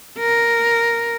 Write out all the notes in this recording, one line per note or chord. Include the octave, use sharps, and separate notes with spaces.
A#4